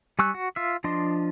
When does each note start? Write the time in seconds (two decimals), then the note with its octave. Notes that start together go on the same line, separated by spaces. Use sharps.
0.19 G3 G#5 C#6 E6 F#6
0.34 F#4
0.56 F4 E5
0.84 F3 D4 D#5 C6